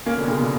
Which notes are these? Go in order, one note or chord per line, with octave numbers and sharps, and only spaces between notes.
A#3 C#4
B2 D3
A#2 C#3
B2